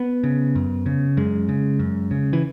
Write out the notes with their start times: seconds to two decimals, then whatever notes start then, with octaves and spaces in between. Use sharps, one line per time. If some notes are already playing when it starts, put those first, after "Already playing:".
Already playing: B3
0.24 C#3
0.55 F#2
0.86 C#3
1.17 F#2 G#3
1.49 C#3
1.79 F#2
2.11 C#3
2.33 E3